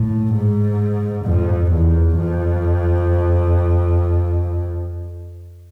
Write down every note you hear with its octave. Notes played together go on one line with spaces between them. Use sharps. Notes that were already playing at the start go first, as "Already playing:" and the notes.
Already playing: A2
G#2
F2
E2
F2